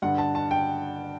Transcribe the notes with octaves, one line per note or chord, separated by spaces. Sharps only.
G2 D3 F#5
A5
A5
G5